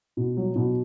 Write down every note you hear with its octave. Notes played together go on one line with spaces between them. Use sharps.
B2
F#3
B2